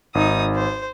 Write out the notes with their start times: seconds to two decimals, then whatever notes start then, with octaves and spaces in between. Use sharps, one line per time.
0.15 G#1 D#4 D#6
0.55 C5